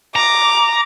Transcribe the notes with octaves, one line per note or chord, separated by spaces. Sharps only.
A#5 D6